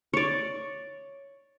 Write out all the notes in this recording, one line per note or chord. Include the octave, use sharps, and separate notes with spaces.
C#5 D5